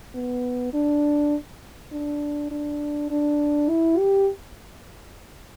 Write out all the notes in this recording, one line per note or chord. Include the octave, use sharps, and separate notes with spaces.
B3
D4
D4
D4
D4
E4
G4